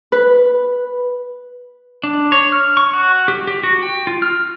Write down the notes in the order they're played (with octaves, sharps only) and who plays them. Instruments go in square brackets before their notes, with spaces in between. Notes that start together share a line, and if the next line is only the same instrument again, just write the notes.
[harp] B4
[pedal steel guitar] D4
C#5
F6
C#6
F#4
G4
G4
F#4
G5
F4
F6